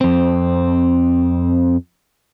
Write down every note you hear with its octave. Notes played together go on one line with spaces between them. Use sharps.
F2 C4